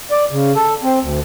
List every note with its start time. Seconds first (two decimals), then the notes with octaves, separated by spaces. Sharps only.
0.11 D5
0.31 C#3
0.55 A4
0.83 C4
1.02 D2